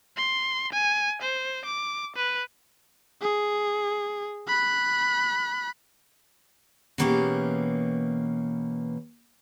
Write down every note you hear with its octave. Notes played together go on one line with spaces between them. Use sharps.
C6
G#5
C5
D6
B4
G#4
B5 F#6
B2 E3 A#3 C#4 G4 G#4